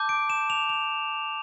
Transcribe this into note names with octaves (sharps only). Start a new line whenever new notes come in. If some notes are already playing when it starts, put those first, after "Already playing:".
Already playing: A5 D6 G6
D7
E7
F7
F7